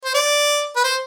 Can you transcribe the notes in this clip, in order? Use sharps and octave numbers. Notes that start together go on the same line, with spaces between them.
C5
D5
B4
C5